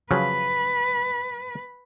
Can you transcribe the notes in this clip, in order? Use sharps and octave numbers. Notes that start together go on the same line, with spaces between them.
C#3 F3 F#3 B4